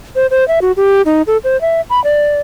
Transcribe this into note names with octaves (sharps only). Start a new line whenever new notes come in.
C5
C5
E5
F#4
G4
D#4
A4
C5
E5
B5
D5